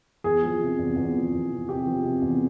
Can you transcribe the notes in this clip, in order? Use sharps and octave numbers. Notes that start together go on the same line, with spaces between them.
E2 G#4
F3
C3
E2
E2
F3
E2
C3
C3 G4
F3
C3
E2